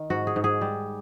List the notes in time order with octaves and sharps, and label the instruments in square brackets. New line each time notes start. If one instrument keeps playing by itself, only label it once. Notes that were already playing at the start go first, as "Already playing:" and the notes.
Already playing: [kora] D#3
G#2 F#4
G#4
G#2
G#4
G3